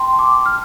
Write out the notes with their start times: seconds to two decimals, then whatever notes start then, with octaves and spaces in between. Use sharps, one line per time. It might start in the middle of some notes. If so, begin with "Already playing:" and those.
Already playing: G5 A5 C6
0.19 D6
0.46 F6